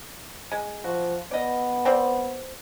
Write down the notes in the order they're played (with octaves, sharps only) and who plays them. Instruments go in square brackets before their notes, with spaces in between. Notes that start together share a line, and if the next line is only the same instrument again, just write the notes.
[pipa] G#3
[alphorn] F3 [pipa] F#4
[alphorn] B3 [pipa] D5 D#5
[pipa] C4 C5 D5